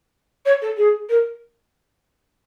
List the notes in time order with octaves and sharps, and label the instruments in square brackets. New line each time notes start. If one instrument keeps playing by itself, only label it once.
[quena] C#5
A4
G#4
A#4